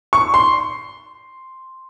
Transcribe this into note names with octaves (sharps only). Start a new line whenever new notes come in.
C#6
C6